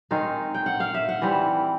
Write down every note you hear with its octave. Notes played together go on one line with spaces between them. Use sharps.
D#3 G#3 C4 F5
G5
F#5
F5
E5
F#5
E3 G3 C4